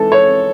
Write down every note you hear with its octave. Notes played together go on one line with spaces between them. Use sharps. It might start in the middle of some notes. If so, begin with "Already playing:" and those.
Already playing: G#2 E3 A4
C#5